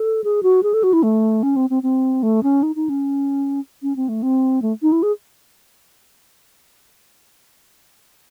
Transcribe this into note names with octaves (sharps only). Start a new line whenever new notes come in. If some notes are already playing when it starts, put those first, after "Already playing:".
Already playing: A4
G#4
F#4
G#4
A4
F#4
E4
A3
C#4
C4
C4
C4
A3
C#4
D#4
D#4
C#4
C#4
C4
A3
C4
A3
D#4
E4
G#4